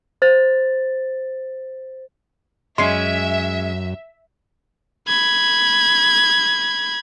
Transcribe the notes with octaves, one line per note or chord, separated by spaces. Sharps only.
C5 A6
F#2 G#3 C#4 E5 C6 C7
B5 G#6